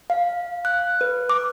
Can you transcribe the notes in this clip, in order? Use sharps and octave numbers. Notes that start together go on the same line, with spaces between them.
F5
F#6
B4
D6